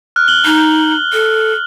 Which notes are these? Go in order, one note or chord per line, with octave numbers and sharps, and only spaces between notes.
F6 F#6
F#7 G7
D#4
A4